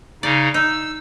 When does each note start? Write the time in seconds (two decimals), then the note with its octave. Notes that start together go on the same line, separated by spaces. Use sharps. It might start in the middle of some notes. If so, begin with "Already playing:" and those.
0.23 C#3 D#4 D5
0.54 D#4 E6